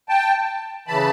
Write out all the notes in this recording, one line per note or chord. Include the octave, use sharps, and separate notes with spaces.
G5 A5
C#3 E3 A5 B5